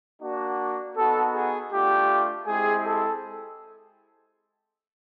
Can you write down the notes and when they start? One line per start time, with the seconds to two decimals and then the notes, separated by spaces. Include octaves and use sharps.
0.21 A#3 D4 F#4
0.96 B3 D#4 F#4 A4
1.33 G#4
1.71 A3 D4 F4 G4
2.47 G#3 C4 E4 G4 G#4
2.85 A4